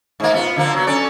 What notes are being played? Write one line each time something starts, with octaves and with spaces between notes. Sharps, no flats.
G#2 A#3
B3 F4
D3 F3 A#3
F#3 B3
C#4 A4 D5